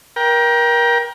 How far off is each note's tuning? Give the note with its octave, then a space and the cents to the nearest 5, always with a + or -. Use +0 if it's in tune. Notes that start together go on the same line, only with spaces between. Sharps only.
A#4 +30 G5 +0